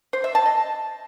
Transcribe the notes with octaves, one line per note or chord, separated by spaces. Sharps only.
C5
E5
A5
D#5